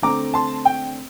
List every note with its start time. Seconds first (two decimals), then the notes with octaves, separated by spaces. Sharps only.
0.02 D3 A3 C4 A#5 D6
0.34 A5 C6
0.65 G5